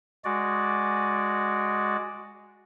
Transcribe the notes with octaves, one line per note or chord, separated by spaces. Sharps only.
G#3 F#4 D5